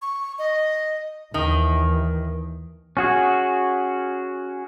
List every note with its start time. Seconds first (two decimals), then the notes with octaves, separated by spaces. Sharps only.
0.02 C#6
0.39 D#5
1.34 D#2 D#3 E3
2.97 C#4 F#4 G#4